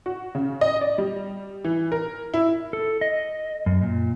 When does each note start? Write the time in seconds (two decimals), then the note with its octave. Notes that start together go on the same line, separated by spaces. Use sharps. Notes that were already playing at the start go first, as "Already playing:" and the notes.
0.06 F#4
0.35 C#3
0.61 D#5
0.81 D5
0.98 G3
1.64 E3
1.92 A#4
2.34 E4
2.73 A4
3.01 D#5
3.66 F#2
3.81 A#2